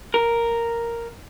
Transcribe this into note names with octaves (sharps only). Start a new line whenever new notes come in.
A#4